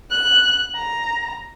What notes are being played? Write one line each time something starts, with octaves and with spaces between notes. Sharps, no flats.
F#6
A#5